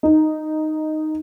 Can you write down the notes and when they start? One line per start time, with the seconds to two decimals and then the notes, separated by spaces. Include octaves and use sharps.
0.03 D#4